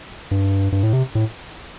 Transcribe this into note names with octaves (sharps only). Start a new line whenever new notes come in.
G2
G2
A2
C3
A2